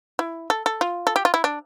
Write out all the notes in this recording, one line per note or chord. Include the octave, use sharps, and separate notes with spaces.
E4
A4
A4
F4
A4
G4
F4
E4
D4